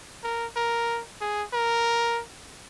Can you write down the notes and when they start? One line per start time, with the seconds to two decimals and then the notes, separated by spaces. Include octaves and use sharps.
0.24 A#4
0.56 A#4
1.21 G#4
1.53 A#4